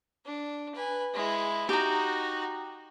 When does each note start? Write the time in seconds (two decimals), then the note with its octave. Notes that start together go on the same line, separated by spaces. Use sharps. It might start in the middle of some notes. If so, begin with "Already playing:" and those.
0.26 D4
0.75 B4 G#5
1.14 G#3 E4
1.69 D#4 F#4 G4 A#5